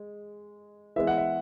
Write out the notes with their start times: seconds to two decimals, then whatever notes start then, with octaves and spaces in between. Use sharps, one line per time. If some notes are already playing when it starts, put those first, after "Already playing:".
Already playing: G#3
0.96 E3 G#3 B3 E5
1.07 F#5
1.18 E5